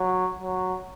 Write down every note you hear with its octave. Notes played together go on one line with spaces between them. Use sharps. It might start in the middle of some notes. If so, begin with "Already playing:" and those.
Already playing: F#3
F#3